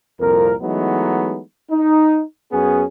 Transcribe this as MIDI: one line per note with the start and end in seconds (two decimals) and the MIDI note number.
0.21 0.54 36
0.21 0.54 41
0.21 0.54 46
0.21 0.54 70
0.62 1.41 52
0.62 1.41 54
0.62 1.41 56
0.62 1.41 57
0.62 1.41 59
0.62 1.41 63
1.71 2.22 63
2.52 2.85 42
2.52 2.85 59
2.52 2.85 61
2.52 2.85 68